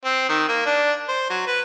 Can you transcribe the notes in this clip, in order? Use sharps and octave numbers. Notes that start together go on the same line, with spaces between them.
C4
D#3
A#3
D4
C5
F#3
B4